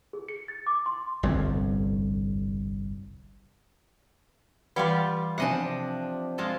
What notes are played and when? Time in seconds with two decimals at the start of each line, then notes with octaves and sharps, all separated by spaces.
0.13 G#4
0.28 C#7
0.48 A6
0.67 D6
0.86 C6
1.23 G1 C2 F2
4.76 E3 G3 F4 G4 F5 F#5
5.38 C3 F3 D4 D#5 E5 F#5 G#5
6.38 G#3 F4 A4